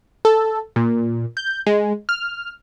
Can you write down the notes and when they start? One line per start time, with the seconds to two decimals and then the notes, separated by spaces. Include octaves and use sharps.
0.25 A4
0.76 A#2
1.37 G6
1.67 G#3
2.09 F6